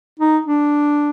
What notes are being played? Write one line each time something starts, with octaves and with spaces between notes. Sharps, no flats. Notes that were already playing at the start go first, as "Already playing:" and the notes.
D#4
D4